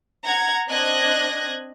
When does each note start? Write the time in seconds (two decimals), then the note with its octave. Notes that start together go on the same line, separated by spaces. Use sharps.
0.25 F#5 A#5 G#6
0.69 C4 D4 D#5 F#6 G#6 A#6